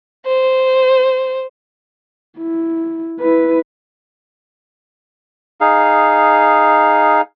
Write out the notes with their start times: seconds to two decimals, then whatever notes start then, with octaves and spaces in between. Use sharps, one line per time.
0.26 C5
2.38 E4
3.20 E4 B4
5.61 D#4 G#4 F5